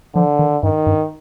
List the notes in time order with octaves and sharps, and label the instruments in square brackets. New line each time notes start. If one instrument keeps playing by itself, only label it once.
[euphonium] D3 [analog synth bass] F3
[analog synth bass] D#3
[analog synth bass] G2 [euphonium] D#3
[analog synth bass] G2